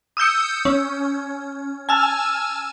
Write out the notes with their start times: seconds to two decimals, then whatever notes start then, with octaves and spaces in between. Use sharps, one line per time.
0.17 D#6 E6 G6 C#7
0.65 C#4
1.89 G#5 A5 E6 F6